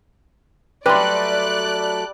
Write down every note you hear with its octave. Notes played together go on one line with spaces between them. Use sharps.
F#3 G3 A3 B4 D5 C6 F#6